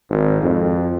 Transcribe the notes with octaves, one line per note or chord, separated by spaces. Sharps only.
G#1
F2